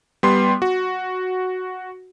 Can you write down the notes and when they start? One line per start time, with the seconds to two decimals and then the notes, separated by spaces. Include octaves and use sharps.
0.23 G3 B3 C6
0.62 F#4